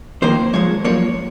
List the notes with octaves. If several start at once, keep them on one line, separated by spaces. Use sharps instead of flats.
F2 D#3 A#3 C5
G#2 F3 G#3 C#5
F#2 F3 A#3 C#5